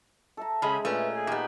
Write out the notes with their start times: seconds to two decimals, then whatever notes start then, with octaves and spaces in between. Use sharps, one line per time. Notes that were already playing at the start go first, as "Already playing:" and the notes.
0.37 A4 E5 A#5
0.62 C#3 G#3 C#4 G#4 B5
0.85 A#2 A3 C#4 B4
1.13 G#4
1.27 A#2 B3 D#4 G4